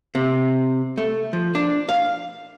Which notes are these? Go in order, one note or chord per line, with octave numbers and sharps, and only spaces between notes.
C3
A3
F3
D4
F5